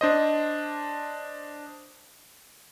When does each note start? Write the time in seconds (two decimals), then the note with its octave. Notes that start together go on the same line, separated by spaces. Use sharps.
0.01 D4 C5 D#5